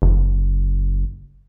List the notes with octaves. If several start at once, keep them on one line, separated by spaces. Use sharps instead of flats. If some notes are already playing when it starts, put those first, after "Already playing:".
F#1